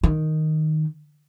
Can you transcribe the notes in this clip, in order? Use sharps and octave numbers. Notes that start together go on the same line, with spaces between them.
D#3